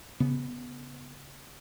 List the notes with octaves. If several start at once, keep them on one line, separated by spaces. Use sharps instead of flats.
C#3 B3